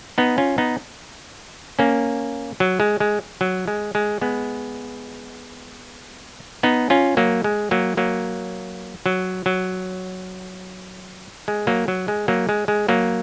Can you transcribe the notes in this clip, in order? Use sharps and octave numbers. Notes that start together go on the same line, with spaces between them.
B3 D#4
C#4 F4
B3 D#4
A#3 C#4
F#3
G#3
G#3
F#3
G#3
G#3
G#3 B3
B3 D#4
C#4 F4
F#3 A#3
G#3
F#3 A#3
F#3 A#3
F#3
F#3
G#3
F#3 A#3
F#3
G#3
F#3 A#3
G#3
G#3
F#3 A#3